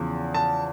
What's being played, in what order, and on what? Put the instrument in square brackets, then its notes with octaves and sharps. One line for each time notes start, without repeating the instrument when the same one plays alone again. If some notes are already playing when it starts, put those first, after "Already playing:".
Already playing: [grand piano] E2 C#3 F3
A5